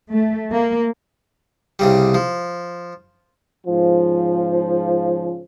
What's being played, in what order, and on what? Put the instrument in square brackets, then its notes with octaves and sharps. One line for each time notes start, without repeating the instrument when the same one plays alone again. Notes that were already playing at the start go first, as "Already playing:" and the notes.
[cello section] A3
A#3
[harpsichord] C2 C#3 G3
F3
[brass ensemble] G#2 C#3 F3